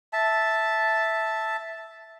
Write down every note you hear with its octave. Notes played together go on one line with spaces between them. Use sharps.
E5 A5